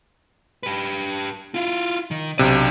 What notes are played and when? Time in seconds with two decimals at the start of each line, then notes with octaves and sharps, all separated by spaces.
0.63 G4 B4
1.54 E4 F4
2.11 D#3
2.38 B1 C3 D4 D5 D#7